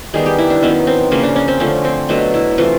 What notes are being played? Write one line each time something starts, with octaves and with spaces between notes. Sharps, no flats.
D#3 G3 B3 G#4
G4
E4
D4
D#3 F#3 B3 C#4
C4
C#3 F3 A#3 C#4
D4
C#4
C4
D3 F3 A3 C#4
C4
B2 F#3 A3 D4
E4
C3 E3 A3 F4